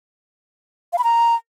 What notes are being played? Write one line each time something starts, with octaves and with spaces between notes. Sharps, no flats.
F5
B5
A#5